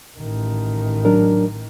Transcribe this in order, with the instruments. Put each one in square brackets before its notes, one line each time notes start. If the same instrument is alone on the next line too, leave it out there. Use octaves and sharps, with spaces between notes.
[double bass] A1 D#3
[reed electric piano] F#3 D4 A#4